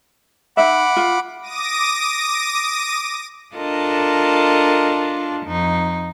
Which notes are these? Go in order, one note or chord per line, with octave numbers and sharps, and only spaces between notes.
D#4 E5 F#5 B5 D6
F4
D6 D#6 A#6 D#7
D4 F4 A4 A#4 D#5 A5
F2 D#4